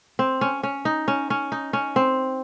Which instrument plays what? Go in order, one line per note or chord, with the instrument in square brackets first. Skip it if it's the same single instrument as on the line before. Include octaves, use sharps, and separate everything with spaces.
[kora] C4
C#4
C#4
D#4
C#4
C#4
D#4
C#4
C4